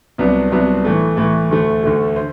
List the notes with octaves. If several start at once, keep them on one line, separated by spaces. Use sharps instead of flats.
C2 C3 F#3 B3 D4
C2 C3 F#3 B3 D4
A2 E3 A3
A2 E3 A3
D2 D3 A3
D2 D3 A3
C5